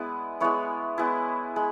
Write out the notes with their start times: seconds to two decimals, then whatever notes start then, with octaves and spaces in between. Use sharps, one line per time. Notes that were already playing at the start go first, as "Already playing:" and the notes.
Already playing: G#3 B3 E4 D5
0.40 G#3 B3 E4 C#5
0.98 G#3 B3 E4
1.56 G#3